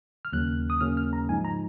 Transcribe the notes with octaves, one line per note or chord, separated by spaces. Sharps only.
F6
D#2 C#3 F#3 A#3 C#4 F#6
D#6
D#2 C#3 F#3 A#3 C#4 F6
F6
A#5
G#2 F3 G#3 D#4 G#5
A#5